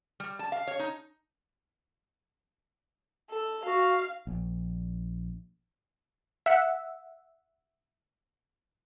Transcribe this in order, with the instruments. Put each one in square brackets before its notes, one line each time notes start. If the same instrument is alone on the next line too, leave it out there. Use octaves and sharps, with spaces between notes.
[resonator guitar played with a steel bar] G3
A5
F5
C#5
D#4
[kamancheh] A4
[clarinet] F#4 [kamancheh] F5
[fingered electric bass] A#1
[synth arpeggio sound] E5 F#5